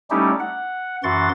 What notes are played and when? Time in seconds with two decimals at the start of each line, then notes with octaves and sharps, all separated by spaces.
0.10 G3 A3 C#4 D#4 E4 G4
0.39 F#5
1.04 F#2 E3 F#4 F#5 C6 A6